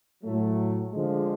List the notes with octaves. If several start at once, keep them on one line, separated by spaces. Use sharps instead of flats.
A2 F#3 A3
D3 F3 G#3